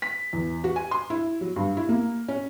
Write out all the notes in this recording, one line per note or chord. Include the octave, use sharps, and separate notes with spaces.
B6
E2
F#4
G#5
C6
E4
F#3
G2
E4
A#3
C#4